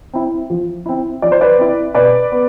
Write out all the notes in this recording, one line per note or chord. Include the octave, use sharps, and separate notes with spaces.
C4 E4
F3
C4 E4
F3 D5
C5
B4 D5
C4 E4
B2 B4 D5
B3